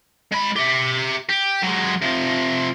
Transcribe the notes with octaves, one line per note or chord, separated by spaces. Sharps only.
G#3 B5
G4 E5
G4
F#3 G#3
C3 F3